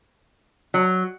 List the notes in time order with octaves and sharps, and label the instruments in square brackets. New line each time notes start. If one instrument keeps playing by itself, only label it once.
[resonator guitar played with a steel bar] F#3